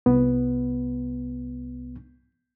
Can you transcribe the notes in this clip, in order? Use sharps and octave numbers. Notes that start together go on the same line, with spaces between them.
C2 B3